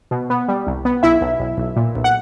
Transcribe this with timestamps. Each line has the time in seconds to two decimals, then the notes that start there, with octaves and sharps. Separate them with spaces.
0.11 B2
0.30 B3
0.48 G3
0.67 C2
0.85 B3
1.03 B1 E4 E5
1.21 B1
1.40 B1
1.57 B1
1.76 A#2
1.95 B1
2.04 F#5